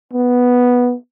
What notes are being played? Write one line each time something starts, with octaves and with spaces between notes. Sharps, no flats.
B3